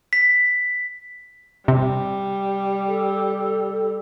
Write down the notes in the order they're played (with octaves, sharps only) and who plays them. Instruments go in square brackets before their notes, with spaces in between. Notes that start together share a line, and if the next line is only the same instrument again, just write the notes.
[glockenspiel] B6
[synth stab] C3 [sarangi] G3
[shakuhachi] A4